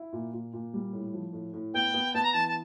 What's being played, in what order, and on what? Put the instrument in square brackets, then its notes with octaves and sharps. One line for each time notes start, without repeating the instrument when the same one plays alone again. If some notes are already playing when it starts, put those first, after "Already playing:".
Already playing: [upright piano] E4
A#2
A#2
A#2
G3
A2
F3
A2
A2
[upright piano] B3 [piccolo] G5
[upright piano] B3
[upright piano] B3 [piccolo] A5
[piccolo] A#5
[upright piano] E3 [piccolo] A5
[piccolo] A5